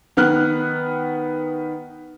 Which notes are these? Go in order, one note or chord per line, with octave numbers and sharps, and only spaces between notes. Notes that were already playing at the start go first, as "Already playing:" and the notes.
D#3 B3 F6 F#6